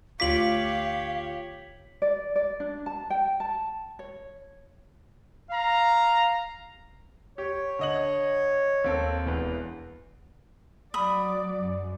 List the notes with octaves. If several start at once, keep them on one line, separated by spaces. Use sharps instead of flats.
D2 F4 G4 C#5 F5 D6 B6 F#7
D5
D5
D4
A5
G5
A5
C#5
F5 A#5
G4 C#5
D3 D#5 F#7
D#2 C4 A4
E1 E2 B4
F#3 D5 B5 D#6
F#2